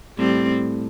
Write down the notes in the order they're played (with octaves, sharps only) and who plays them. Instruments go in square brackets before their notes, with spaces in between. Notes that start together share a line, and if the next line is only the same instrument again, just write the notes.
[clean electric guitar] A2 [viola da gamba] G3 C4